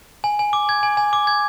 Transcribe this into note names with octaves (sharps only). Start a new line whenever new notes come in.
G#5
G#5
D6
G#6
G#5
G#5
D6
G#6